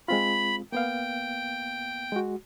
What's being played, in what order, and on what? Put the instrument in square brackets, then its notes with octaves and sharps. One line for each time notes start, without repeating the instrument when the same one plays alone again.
[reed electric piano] G#3 C4 F4 [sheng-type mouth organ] B5
[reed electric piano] A#3 B3 F5 [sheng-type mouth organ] G5
[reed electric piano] G#3 F#4